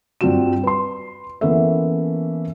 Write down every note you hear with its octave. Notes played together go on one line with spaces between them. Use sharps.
G2 C4 F4 F#4 E7
B4 C6
E3 A#3 B3 C#4 A4 E5